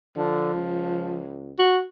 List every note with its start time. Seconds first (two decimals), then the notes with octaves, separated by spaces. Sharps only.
0.16 D3 F3
0.54 C#2
1.59 F#4